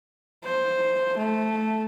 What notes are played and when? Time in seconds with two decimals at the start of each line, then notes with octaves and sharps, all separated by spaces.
0.44 C5
1.17 A3